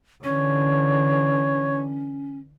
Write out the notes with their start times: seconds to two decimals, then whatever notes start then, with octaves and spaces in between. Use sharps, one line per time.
0.24 D3 E3 C#4 C#5